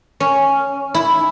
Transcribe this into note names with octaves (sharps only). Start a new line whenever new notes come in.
C#4
E4